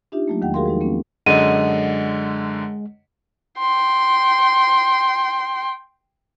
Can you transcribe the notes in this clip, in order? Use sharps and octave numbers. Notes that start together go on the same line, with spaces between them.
D4 D#4 F4 G4 E5
F#3 A3 A#3
E2 D#3 G#3 F#5 G5
F#4 G#4 A#4 F5 C6
F3 G#3 D#4
A#3 C4 C#4
F#2 D3 G#3 D#5 F#5 D#7
G5 C6